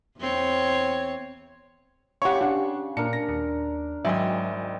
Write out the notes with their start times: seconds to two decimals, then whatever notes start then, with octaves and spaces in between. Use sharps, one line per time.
0.18 E2 C4 C#5
2.22 C#3 G4 C#5 F#5 C6 C#6
2.41 D4 G4 F#5
2.97 A#2 D4 A#4 C#7
3.13 A#6
3.29 D#2
4.05 G#1 F#3 D#5 E5 G5 G#5 C6